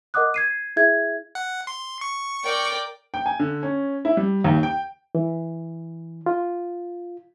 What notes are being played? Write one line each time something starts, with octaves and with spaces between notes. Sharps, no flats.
A#4 D#5 F#5 D6 D#6 F#6
G#6 C7 D#7
E4 G#4 E5 G#6
F#5
C6
C#6
A#4 D5 G5
G5
G#5
D3
C#4
E4
G3
D#2
G5
E3
F4